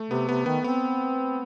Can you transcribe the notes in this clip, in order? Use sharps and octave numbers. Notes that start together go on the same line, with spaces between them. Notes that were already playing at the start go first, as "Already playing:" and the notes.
Already playing: A3
C3 B3
C3 B3
D#3 B3
B3 C4